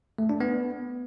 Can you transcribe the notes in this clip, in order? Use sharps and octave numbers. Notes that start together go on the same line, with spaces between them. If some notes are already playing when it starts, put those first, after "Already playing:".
A3
D4
B3